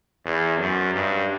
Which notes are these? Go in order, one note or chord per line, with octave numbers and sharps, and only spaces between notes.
E2
F#2
G2